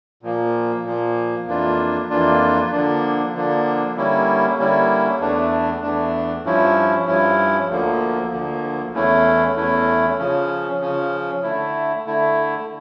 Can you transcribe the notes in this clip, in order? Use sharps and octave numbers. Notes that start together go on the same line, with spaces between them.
A#2 F3 A#3
A#2 F3 A#3
F2 E3 A#3 D4 F4
F2 E3 A#3 D4 F4
D3 F3 A#3 D4
D3 F3 A#3 D4
D3 G3 A#3 C#4 E4
D3 G3 A#3 C#4 E4
E2 E3 A3 D4
E2 E3 A3 D4
G2 F3 C#4 E4
G2 F3 C#4 E4
D2 D3 F3 A#3
D2 D3 F3 A#3
E2 E3 A3 C#4 E4
E2 E3 A3 C#4 E4
C#3 F3 C#4
C#3 F3 C#4
D3 A3 E4
D3 A3 E4